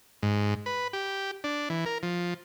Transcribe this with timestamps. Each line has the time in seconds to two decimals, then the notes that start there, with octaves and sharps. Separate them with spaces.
0.22 G#2
0.66 B4
0.93 G4
1.44 D4
1.70 E3
1.86 A#4
2.03 F3